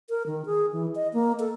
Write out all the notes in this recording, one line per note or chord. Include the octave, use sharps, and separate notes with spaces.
A#4
D#3
G#4
E3
D#5
A#3
A4